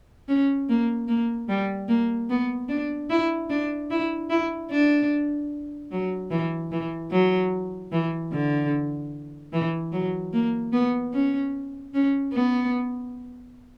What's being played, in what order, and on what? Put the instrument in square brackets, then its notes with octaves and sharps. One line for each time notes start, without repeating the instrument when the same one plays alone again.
[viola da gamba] C#4
A#3
A#3
G3
A#3
B3
D4
E4
D4
E4
E4
D4
F#3
E3
E3
F#3
E3
D3
E3
F#3
A#3
B3
C#4
C#4
B3